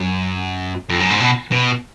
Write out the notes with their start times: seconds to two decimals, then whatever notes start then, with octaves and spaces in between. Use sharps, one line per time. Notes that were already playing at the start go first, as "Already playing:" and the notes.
Already playing: F#2
0.89 F2
1.00 F#2
1.10 G#2
1.21 B2
1.51 B2